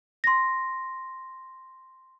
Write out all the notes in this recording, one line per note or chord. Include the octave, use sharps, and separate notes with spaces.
C6 A#6